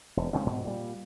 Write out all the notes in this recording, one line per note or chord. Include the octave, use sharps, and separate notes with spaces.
E1
C#3 G#3 C4 C#4
G#2 B2
A#2 G3